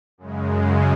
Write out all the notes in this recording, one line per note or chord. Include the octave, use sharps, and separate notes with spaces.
F#2 C#3 G#3